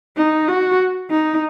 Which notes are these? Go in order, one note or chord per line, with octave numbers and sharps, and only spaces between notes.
D#4
F#4
D#4